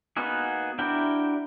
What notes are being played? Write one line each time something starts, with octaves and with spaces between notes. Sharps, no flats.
A#3 B3 D#4 F#4 G#4
D4 E4 F#4 A#4 G5